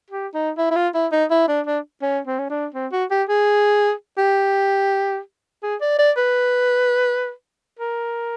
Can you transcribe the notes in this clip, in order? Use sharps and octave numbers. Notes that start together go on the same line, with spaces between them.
G4
D#4
E4
E4
F4
E4
D#4
E4
D4
D4
C#4
C4
C#4
D4
C4
F#4
G4
G#4
G4
G#4
D5
D5
B4
A#4